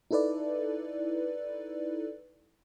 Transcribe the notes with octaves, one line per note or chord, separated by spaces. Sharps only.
D#4 E4 A4 B4 D5